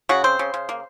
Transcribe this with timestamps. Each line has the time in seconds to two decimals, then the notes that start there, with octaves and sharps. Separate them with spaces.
0.09 C#3 F#4
0.24 C4 C5
0.39 C#3
0.54 C#3
0.69 A#3